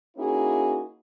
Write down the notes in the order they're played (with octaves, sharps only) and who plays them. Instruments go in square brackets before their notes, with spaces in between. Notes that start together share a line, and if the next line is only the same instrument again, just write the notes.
[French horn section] A#3 C#4 D#4 E4 F#4 G#4